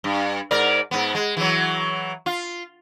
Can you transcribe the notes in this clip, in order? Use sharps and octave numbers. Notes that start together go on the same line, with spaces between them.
G2
G#2 A#4 D5
G#2 B3
G#3
E3 F#3
F4